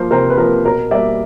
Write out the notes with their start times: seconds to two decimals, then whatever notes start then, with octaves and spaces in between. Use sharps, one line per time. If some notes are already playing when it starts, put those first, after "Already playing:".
Already playing: F3 A#3 A#4 C5
0.11 C3 A#4 C5
0.30 B4
0.38 F3 A#3 A#4
0.65 B2 A#4
0.91 G3 A#3 D5 E5